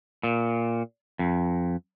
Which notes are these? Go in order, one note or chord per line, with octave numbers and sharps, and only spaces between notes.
A#2
F2